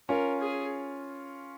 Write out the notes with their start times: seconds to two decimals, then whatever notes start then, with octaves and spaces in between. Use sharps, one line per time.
0.09 C#4 F4 A#4
0.40 G#4